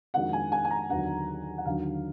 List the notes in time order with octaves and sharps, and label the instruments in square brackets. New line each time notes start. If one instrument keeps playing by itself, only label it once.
[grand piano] F2 D#3 G#3 D4 F#4 [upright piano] F#5
[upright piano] G#5
G#5
G#5
A#5
[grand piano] D#2 D3 F#3 B3 D4 [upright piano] F#5
[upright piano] F#5
[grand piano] D#2 D3 F#3 D4 [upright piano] F5